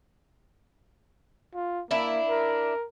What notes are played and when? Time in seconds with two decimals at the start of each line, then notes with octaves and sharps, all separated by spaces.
1.54 F4
1.91 A#3 D4 E4
2.29 A#4